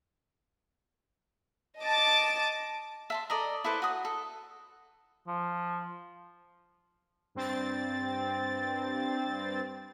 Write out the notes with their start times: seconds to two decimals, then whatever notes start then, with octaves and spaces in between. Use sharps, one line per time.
1.81 D#5 A5 D6 A6
3.10 E5 A5 C6
3.30 A4 D5 D#5 A#5
3.64 E4 A4 B4 C5
3.82 F#4 D#6
4.05 A4
5.27 F3
7.35 G2 C4 A6